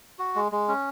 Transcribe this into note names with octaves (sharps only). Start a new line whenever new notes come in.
F#4
G#3
G#3
C#4